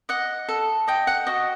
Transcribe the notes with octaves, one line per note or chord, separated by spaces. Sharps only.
D#5 F#5
A4
D#5 G5
F#5
F#4 D#5